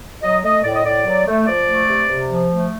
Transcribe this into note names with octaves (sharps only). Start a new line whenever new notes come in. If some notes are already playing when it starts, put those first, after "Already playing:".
F#3 D#5
A3 D#5
A2 D5
D#5
A2 D5
F#3
A3
F3 D5
A3
C3
C3
F3
A3